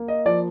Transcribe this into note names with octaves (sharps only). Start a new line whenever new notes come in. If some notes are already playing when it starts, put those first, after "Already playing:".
Already playing: A#3
D#5
F3 D5